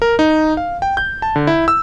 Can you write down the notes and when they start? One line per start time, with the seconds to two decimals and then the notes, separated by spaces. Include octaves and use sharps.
0.02 A#4
0.19 D#4
0.57 F5
0.82 G5
0.97 G6
1.22 A5
1.36 D3
1.47 E4
1.68 E6